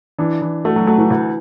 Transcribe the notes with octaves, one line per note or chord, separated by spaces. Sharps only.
E3 D4
E3
A3 F#4
F#3
F#3 A3
E3
D2